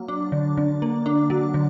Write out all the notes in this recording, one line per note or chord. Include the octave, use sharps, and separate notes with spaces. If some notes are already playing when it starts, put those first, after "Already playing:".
Already playing: F#3 A#3
D4
D3
D3
A#3
D4
F#3
D3